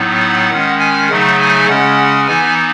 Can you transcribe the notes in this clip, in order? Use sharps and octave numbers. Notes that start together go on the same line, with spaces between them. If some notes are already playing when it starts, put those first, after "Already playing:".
Already playing: A2 F#3 B3 D#4
F#5
D#3 G#3 C#4
G#5
C#3 F#3 A3 D#4 F#5
G#5
C#3 G#3 C#4 F#5
E3 B3 D#4 G#5